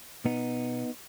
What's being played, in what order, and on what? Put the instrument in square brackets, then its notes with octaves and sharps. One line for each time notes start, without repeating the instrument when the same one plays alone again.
[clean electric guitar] B2 B3 D#4